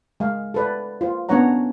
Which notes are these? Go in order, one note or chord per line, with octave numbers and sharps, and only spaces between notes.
G#3 F5
A4 B4 D5
F4 C5
B3 C#4 D4 C#5 F#5 A#5